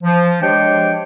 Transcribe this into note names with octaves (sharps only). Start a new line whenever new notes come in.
F3
G#3 D4 G4 C5 C#5 G5